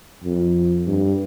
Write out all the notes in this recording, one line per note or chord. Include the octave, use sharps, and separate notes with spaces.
F2
G2